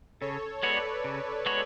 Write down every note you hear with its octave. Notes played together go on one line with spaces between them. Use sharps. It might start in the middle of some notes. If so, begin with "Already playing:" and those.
C#3 A4 C#5
G#3 B3 F#4 B4 C#5 D5
C#3
G#3 B3 F#4 C#5